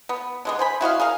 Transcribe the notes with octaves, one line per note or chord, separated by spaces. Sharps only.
B3
D3 G#3 B3
C5 G#5 B5
E4 F#4 D#5 F5
G#4 A#4 F5